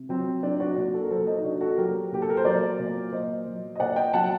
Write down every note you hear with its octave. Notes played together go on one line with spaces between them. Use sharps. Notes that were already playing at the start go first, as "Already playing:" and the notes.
Already playing: C3
F#3 C4
F#3 D4
D4 F#4
A#2 D4
F#4 A4
A#4
F#3 A4 C5
C5 D#5
D#4
A#2 D4 F#4
F#4 A4
F#3 G4 A#4
A#2 G4
A4
A#4
C5
F#3 A#4 D5
A#2
F#3 C5 D#5
F#3
D#5
A#2 D5 F#5
D#5 G5
F#3 F#5 A5